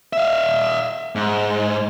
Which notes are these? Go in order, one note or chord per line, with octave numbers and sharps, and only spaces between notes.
E5 F5
G#2